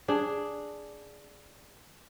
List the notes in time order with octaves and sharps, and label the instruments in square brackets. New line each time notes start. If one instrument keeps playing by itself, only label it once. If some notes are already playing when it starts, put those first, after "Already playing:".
[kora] D4 G#4